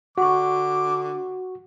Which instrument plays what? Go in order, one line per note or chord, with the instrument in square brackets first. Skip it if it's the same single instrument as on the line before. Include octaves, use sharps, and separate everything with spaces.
[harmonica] D3 D6 [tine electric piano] F#4 [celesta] F#5 C#6